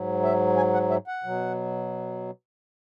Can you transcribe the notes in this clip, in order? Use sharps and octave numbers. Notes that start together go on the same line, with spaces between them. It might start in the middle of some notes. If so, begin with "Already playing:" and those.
Already playing: G#2 F#3
E5
G#5
F#5
E5
F#5
B2 F#3